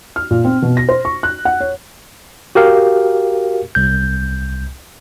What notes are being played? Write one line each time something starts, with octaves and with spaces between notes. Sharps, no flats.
F6
A#2
C4
B2
A#6
C5
C#6
F#6
F#5
C#5
F#4 G4 A#4 F5
C2 G6